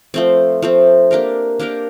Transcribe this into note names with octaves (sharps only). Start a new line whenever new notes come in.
F3 A3 C4
F3 A3 C4
A#3 D4 G4 A#4
A#3 D4 G4 A#4